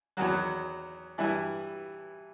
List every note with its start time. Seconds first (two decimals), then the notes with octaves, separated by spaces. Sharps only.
0.17 E2 D#3 F#3 F#4
1.18 G2 E3 E4